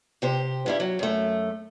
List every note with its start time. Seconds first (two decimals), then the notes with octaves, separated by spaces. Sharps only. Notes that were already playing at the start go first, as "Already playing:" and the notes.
0.22 C3 G4 C5
0.66 G2 G3 E4
0.80 F#3
0.99 F#2 A3